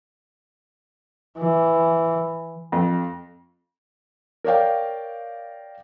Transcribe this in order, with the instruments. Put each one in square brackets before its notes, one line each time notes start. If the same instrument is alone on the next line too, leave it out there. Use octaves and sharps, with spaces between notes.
[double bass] E3
[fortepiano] F2
[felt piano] A#4 C#5 D5 F5 G5